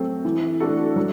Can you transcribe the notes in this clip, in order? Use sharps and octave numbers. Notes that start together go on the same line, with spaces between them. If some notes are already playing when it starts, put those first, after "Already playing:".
Already playing: F#3 A3 C4
E3
A3 D4 F#4 A4
F#3